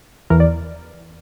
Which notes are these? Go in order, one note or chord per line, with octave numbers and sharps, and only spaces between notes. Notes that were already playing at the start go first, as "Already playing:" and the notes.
E2 E3 A#4
D5